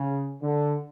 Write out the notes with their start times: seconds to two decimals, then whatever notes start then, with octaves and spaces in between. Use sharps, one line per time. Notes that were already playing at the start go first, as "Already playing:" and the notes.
Already playing: C#3
0.41 D3